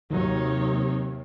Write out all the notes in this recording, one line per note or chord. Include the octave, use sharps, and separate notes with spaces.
D#2 C3 D#3 F#3 D#4 C#5